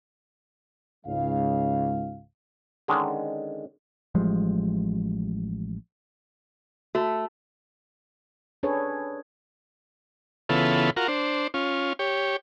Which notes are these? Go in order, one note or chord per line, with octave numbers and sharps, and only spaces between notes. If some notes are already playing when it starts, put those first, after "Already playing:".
C#2 G#2 C#3 G#3 F5
D3 D#3 G#3 C#4
A1 F3 G3 G#3
A3 F#4
C#4 D4 G#4 A4 B4 C#5
C#3 E3 B3 F4 A4
F4 F#4 A#4
D4 C5
C#4 F4
G4 C#5